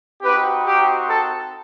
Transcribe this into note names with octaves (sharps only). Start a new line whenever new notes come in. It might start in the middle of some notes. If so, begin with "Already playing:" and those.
C4 D#4 F#4 G4 B4
G4
A4